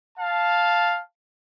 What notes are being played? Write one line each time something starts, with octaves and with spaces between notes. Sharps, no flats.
F5 A5